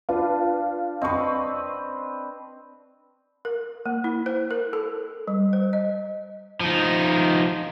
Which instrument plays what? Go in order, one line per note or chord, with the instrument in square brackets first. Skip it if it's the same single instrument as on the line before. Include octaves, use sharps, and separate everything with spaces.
[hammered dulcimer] D4 [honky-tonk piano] F4 B4
[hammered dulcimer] C4 B4 [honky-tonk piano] D#5 C#6
[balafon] A#4
A#3
E4
C5
A#4
A4
G3
C5
D#5
[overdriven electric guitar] F3 D#4